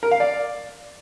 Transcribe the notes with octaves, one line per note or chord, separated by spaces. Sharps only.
A#4
F5
D5